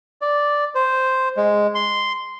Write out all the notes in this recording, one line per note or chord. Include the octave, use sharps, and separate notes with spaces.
D5
C5
G#3
C6